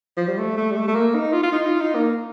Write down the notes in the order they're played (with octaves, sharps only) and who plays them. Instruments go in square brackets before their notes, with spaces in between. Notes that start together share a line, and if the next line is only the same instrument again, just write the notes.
[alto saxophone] F3
G3
A3
A3
G3
A3
A3
A#3
D#4
F4
F4
D#4
F4
D#4
A#3